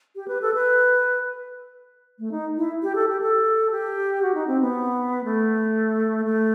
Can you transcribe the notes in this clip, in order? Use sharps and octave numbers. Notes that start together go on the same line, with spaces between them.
G4
B4
A4
B4
A3
D#4
E4
G4
A4
G4
A4
G4
F#4
D#4
C4
B3
A3
A3